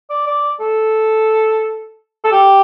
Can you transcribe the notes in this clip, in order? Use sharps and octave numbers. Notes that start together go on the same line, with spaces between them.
D5
D5
A4
A4
G4